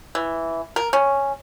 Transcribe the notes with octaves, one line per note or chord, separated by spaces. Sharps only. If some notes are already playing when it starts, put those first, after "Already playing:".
E3
A#4
C#4